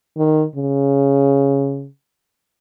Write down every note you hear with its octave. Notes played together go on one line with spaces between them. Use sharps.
D#3
C#3